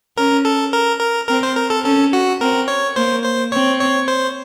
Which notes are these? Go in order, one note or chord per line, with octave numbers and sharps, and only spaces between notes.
C#4 A#4
A4
A#4
A#4
C4 A#4
C5
A#4
A4
C#4 A4
F#4
C4 A#4
C#5
A#3 C5
C5
C4 C#5
C#5
C5